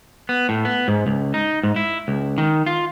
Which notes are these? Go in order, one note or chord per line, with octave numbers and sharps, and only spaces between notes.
B3
A2
B3
G#2
C#2
D#4
G#2
E4
C#2
D#3
F4